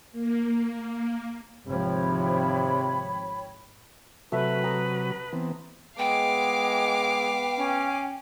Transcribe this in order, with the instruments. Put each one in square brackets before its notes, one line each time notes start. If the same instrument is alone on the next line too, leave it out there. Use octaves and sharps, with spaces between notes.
[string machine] A#3
[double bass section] G#1 F3 [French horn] C3 [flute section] C#5 G5 B5
[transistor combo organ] C3 F#3 F#4 [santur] A3 E5 [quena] B4
[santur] A#5 D#6
[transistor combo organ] E3 B3 C4
[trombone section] G#3 [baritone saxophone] B3 [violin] F5 D6 [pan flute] G5
[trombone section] C#4